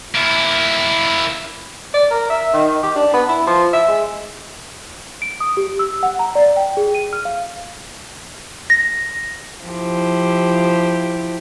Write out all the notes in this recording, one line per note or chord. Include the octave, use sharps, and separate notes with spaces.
A#3 E4
D5
A#4
E5
D#3
G4
D4
B3
E4
F3
E5
G#3
D7
D#6
G4
E6
F#5
A#5
D5
G5
G#4
D#7
F6
F5
A#6
F3 E4 G4